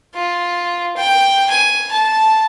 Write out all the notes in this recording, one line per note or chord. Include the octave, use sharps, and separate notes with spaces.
F4
G5
G#5
A5